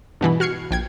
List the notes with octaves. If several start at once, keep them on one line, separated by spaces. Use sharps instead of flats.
G2 B2 E3 B5
F#4 F6 G#6 C7 C#7
A#1 G5 G#6